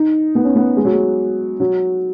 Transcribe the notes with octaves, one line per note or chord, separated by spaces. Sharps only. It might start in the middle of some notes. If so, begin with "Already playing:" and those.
Already playing: D#4
B3
C#4
B3
G#3
F#3
G#3
F#3